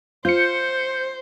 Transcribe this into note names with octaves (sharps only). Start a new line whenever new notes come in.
F4 C5 G6 C#7